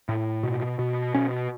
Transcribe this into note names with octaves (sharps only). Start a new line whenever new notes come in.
A2
B2
B2
B2 C#4